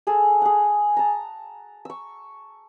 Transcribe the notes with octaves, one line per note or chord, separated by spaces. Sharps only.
G#4 A4 G#5
G#4 F#5
A5 A#5
C#6 E6